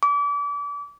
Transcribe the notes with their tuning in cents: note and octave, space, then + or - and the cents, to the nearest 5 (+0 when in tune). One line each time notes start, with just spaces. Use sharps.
D6 -35